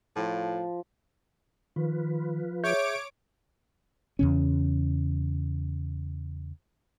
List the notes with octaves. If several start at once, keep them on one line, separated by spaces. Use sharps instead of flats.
A2 F3
D#3 F3 F4 B4
G#4 C#5 E5 D6 G6 D7
E2 C#3 C#4